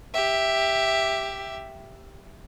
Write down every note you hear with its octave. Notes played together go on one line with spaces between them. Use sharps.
G4 E5